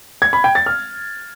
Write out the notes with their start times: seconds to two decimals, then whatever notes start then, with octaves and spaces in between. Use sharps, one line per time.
0.22 G#6
0.33 B5
0.44 G5
0.55 A6
0.66 F6